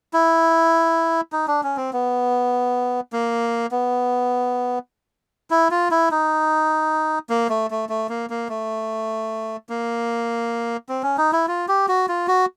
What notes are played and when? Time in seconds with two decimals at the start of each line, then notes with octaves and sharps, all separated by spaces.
0.13 E4
1.32 D#4
1.48 D4
1.63 C#4
1.77 C4
1.93 B3
3.13 A#3
3.71 B3
5.50 E4
5.71 F4
5.91 E4
6.11 D#4
7.30 A#3
7.49 A3
7.71 A3
7.89 A3
8.09 A#3
8.30 A#3
8.49 A3
9.69 A#3
10.89 C4
11.03 C#4
11.18 D#4
11.33 E4
11.48 F4
11.68 G4
11.88 F#4
12.09 F4
12.28 F#4